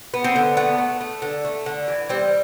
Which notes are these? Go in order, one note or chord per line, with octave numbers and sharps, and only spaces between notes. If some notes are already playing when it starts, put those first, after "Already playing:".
B3
C4
D3
A3 B3
A3
A3
D3
A3
D3
E3
G3 C4